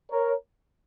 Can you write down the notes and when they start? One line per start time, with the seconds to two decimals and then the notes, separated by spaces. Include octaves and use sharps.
0.10 A#4 C#5